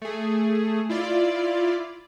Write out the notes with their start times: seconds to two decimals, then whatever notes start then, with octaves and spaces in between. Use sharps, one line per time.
0.02 A3 G#4
0.89 E4 F4 D5